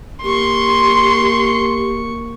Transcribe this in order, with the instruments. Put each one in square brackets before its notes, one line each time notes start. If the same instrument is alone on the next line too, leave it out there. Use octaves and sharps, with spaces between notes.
[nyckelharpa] A#3 C#6 [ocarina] G4 [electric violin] C6